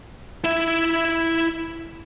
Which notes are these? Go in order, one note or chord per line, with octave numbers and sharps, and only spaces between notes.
E4 E5